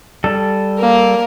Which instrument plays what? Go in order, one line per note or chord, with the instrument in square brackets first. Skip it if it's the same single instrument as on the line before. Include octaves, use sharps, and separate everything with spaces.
[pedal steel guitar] G3 A4
[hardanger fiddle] A#3 A#4